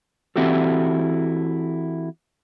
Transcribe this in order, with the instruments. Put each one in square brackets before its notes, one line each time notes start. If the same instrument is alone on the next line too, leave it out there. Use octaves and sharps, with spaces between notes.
[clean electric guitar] E3 C4 E4 F#4 G4 A4